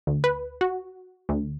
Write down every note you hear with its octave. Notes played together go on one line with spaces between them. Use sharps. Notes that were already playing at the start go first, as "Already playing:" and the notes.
D2
B4
F#4
D2